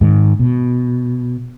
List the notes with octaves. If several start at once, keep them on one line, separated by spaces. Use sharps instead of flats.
G#2 D#3
B2